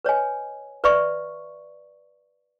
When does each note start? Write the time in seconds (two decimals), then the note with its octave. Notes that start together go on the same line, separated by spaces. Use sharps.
0.05 B4 C#5 D#5 G#5
0.84 B4 D5 E5 B5 C#6